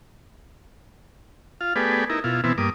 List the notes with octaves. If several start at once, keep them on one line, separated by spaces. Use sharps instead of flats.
F4 F5
A3 B3 G4 G#4 B4 D5
D#4 E4 A#4
B2 E4 F4
B2 E3 B3 C4 E4
G2 A#3 D6 D#6